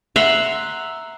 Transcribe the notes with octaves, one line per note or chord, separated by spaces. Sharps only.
E5 F#5 A#5 C6